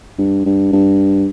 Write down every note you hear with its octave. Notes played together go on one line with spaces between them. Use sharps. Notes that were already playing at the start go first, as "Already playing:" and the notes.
G2
G2
G2